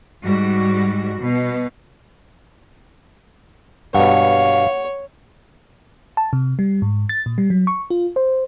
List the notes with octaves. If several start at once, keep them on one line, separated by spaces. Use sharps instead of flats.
G#2 G3 F#4
B2
G2 B2 C#5 F5 F#5
A5
C3
G3
G#2
A6
A#2
G3
F#3
C#6
F4
C5